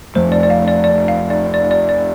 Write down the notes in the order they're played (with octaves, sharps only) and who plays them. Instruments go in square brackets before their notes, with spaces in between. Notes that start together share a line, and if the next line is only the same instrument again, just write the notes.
[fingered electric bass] F2 F3 A3 [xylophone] C5
[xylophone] D5
D5
F5
D5
D5
F5
D5
D5
D5
D5